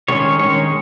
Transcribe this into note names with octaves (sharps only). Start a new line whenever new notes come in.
D#3 G#3 C#4 C#5
D#3 G#3 C#4 C#5